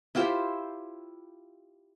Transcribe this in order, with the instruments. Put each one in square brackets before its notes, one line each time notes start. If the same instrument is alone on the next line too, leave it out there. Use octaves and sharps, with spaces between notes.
[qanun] E4 F4 G4 C5